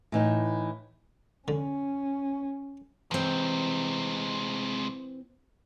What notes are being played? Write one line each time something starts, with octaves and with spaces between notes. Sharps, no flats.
A2 E3 D#4
D3 C#4
C3 E3 G#3 C4